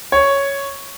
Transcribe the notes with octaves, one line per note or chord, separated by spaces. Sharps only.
C#5